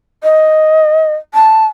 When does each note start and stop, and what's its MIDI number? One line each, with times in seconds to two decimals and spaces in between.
0.23 1.15 75
1.34 1.66 81